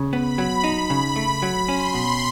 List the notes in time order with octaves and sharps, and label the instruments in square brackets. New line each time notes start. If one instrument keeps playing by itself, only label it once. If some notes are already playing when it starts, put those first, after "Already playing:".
Already playing: [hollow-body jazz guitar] C#3
[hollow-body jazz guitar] B3 [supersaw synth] B5
[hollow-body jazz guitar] F#3
[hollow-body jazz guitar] D#4 [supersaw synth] B5
[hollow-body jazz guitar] C#3
A3
F#3
[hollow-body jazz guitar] C#4 [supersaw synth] C6
[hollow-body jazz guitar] B2